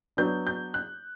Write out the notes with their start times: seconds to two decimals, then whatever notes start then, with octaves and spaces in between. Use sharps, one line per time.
0.17 F#3 B3 D4 G6
0.47 G6
0.74 F#6